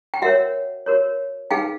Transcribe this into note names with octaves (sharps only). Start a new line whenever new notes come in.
G5
F#4 A#4 C#5 E5 F#5
F#4 A#4 C#5
D#4 G#4 B4 F5 G5